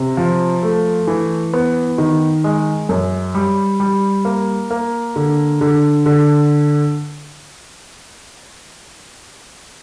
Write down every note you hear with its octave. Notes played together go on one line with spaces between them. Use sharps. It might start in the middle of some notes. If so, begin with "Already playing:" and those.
Already playing: C3
F3
A3
E3
B3
D#3
G#3
F#2
G3
G3
A#3
A#3
D3
D3
D3